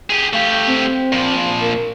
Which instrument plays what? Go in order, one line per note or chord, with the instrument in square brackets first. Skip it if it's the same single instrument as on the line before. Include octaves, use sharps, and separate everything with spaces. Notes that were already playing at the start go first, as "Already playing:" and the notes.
[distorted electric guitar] G4 G#4
[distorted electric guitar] A3 G4 [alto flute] F5
[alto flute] C4
[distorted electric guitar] A#2 F3
[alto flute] A#4